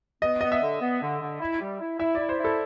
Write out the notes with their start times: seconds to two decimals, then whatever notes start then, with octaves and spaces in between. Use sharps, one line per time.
0.22 B3 D#5
0.41 B3 D#5
0.52 E5
0.62 D3
0.81 B3
1.01 D3
1.21 D3
1.41 E4
1.61 G3
1.80 E4
2.00 E4 E5
2.15 E4 D5
2.29 C5
2.39 E4
2.44 A4